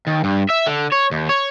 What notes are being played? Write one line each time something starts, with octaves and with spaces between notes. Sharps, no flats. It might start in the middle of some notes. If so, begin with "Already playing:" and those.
D#2
G2
E5
D3
C#5
D#2
C#5